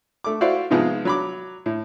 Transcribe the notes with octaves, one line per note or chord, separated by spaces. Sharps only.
A3 D6
E4 F#4 C5 D5 F5
G#2 C3 F3 G#3 B3 F4
F#3 B5 D6
A2